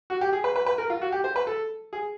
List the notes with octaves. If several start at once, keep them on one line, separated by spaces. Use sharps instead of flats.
F#4
G4
G#4
B4
B4
B4
A#4
F4
F#4
G4
C5
B4
A4
G#4